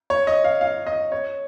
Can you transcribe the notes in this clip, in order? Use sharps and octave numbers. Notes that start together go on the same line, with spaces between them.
C#5
D#5
F5
F5
D#5
C#5